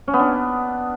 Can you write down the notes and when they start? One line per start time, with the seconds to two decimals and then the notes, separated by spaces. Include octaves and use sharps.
0.08 C#4
0.14 B3
0.19 D4